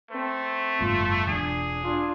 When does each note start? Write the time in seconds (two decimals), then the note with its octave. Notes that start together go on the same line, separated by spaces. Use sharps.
0.11 A3 C4
0.81 F#1 G#2 F4
1.27 E1 D4 G#4
1.82 D4 F4